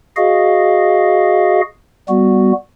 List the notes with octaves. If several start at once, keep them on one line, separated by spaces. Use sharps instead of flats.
F#4 G#4 D#5 F5
G3 B3 F#4